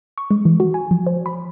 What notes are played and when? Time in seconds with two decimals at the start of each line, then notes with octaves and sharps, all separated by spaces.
0.18 C#6
0.31 G#3
0.45 E3
0.60 F#4
0.74 G#5
0.91 F3
1.07 C5
1.26 B5